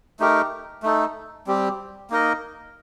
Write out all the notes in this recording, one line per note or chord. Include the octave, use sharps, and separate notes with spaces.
A3 D#4 G4 A#4
A3 D#4 A4
G3 C4 G4
A#3 D#4 A#4 D#5